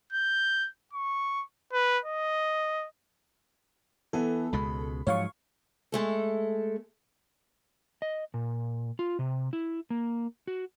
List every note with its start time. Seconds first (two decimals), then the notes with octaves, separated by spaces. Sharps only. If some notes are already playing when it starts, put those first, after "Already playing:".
0.13 G6
0.93 C#6
1.73 B4
2.05 D#5
4.13 E3 B3 A4
4.53 C#2 B2 G#3 B5
5.07 G#2 F3 F#3 C#5 F5 C#6
5.92 G#3 A3 A4
8.02 D#5
8.34 A#2
8.99 F4
9.19 C3
9.53 E4
9.90 A#3
10.48 F#4